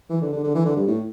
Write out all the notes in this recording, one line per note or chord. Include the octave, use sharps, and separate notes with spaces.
E3
D3
D3
D3
E3
D3
G2
A2